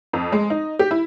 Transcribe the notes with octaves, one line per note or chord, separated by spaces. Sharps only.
F2
G#3
D#4
G4
E4